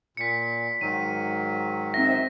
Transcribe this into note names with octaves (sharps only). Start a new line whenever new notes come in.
A#2 B6 C#7
G#2 D#3 F#3 D#7
C4 D#4 E5 A#6